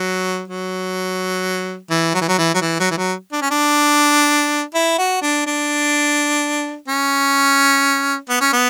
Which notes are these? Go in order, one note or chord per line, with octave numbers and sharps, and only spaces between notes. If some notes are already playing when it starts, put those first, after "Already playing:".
Already playing: F#3
F#3
E3
F#3
E3
F#3
E3
F#3
E3
F#3
E3
F#3
D4
C#4
D4
E4
F#4
D4
D4
C#4
B3
C#4
B3